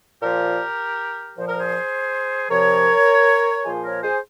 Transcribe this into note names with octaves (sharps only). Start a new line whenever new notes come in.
A#2 F3 G4 A#4
A#2 F3 C5
A#4
G#4 C5
C3 F3 A#4 C#5
A#2 F3 G#4 C5
A#4 C#5
G#4 C5